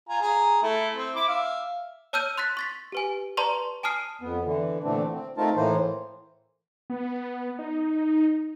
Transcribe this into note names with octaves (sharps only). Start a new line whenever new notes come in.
F4 G#5 A#5
G#4 A#5
A3 E4
C4
E4 D6
E5 F5
C#5 A5 E6 F6 G6 D#7
C6 F#6 A6 B6
C#6 A6 B6
G4 B4 G#5
B4 D5 A5 A#5 C6 C#6
G#5 A5 D#6 F6 C7 D#7
F2 B3
D3 E3
A#2 D3 E3 A3 C4 D4
C4
A3 C4 D#4 F4 A#4 A5
A2 E3 A#3 C5
B3
D#4